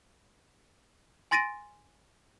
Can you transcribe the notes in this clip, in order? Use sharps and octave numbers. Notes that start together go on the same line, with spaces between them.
G#5 C6 A6 A#6 D7 D#7